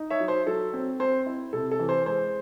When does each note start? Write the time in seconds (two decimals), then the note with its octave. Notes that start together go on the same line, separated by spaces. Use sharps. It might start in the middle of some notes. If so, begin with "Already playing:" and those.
Already playing: D#4
0.10 C#5 E5
0.20 F#3
0.28 C5
0.46 F#3 A4
0.73 C4
0.99 C4 C5
1.26 E4
1.53 C3 A4
1.71 A4
1.79 E3
1.89 C5
2.06 G#3 C5